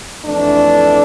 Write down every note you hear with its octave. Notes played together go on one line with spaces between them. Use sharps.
F2 E3 A3 D4